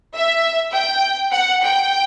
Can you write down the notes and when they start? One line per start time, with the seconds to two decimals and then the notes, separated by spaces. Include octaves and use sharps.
0.16 E5
0.73 G5
1.32 F#5
1.61 G5